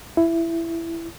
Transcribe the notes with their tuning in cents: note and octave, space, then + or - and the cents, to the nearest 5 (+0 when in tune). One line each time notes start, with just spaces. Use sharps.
E4 +15